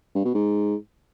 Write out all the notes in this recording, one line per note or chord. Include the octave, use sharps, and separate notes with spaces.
G2
B2
G#2